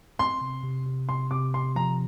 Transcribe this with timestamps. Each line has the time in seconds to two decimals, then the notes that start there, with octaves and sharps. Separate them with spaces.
0.19 C4 C6
0.41 C3
0.63 C3
0.87 C3
1.09 C3 C6
1.31 C3 D6
1.54 C3 C6
1.76 F3 A#5